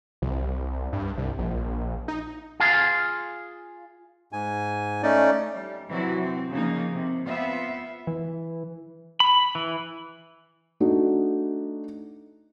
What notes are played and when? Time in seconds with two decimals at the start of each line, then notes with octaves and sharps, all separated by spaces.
0.22 C2
0.93 G2
1.17 C2
1.38 A#1
2.08 D#4
2.60 F4 G#4 F5
4.32 G#2 G#5
5.03 A3 C#4 D#4 D5
5.56 G3
5.88 C3 E3 F#3 E4 F#4
6.22 C4
6.51 C#3 F3 A#3 D#4
6.92 C3
7.27 B3 C4 F4 E5
8.07 E3
9.20 B5
9.55 E3
10.80 A3 D4 D#4 F#4